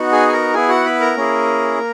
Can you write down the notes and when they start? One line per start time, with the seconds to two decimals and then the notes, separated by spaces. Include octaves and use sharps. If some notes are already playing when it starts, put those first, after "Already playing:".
Already playing: B3 D#4 F#4
0.12 G#4 G#5
0.29 G#5
0.33 A#4 A#5
0.54 B3 E4 G#4 G#5
0.69 F#4 F#5
0.86 B4 B5
1.00 A#4 A#5
1.17 A#3 C#4 E4 G#4
1.78 A#3